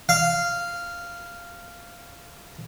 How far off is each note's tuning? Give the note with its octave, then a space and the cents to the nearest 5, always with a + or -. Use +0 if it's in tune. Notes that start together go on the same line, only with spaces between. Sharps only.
F5 -10